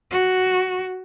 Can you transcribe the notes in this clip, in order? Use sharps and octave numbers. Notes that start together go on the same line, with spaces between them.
F#4